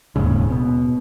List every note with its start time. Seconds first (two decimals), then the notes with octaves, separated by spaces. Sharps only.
0.16 D#1 D#2 G#2 C#3
0.50 B2